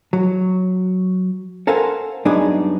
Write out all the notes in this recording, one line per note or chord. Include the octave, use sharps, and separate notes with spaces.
F#3
A4 A#4 C5 F5 F#5 G#5
F#2 G3 B3 D4 D#4 G#4